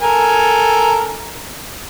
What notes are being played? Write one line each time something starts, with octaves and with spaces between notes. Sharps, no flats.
A4 A#4 G#5